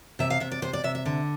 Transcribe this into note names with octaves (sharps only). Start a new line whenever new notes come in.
C3 E5
F5
C3 E5
D5
C3 C5
D5
C3 E5
E5
D3